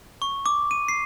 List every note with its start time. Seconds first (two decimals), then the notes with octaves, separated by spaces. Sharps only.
0.22 C#6
0.46 D6
0.71 D#7
0.88 C7